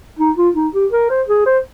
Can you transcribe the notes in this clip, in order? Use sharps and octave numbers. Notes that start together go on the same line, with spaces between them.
D#4
F4
D#4
G4
A#4
C5
G#4
C5